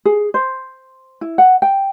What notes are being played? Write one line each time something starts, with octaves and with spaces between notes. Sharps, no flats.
G#4
C5
E4
F#5
G5